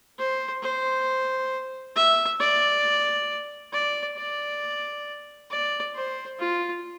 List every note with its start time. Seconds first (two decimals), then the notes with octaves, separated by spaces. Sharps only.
0.19 C5
0.63 C5
1.96 E5
2.40 D5
3.73 D5
4.17 D5
5.51 D5
5.95 C5
6.39 F4